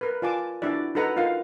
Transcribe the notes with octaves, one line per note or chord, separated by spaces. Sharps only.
A#4 B4
F4 D5 G#5 A5 D6
D4 E4 F#4 D5
D#4 F#4 A4 B4 F#5 A#5
D#4 F4 A#4 F5